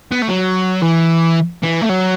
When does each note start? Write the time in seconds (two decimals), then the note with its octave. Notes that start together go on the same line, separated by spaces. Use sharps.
0.12 B3
0.22 A3
0.29 F#3
0.82 E3
1.63 E3
1.81 A3
1.89 F#3